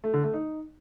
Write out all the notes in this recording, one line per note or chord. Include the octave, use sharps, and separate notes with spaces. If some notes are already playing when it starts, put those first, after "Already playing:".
A3
D3
A3
D#4